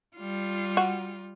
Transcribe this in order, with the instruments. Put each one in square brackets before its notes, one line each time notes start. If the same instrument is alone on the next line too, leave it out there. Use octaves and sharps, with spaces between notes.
[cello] G3 F4
[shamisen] F#4